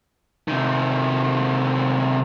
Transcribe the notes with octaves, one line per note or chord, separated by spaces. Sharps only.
C3 D#3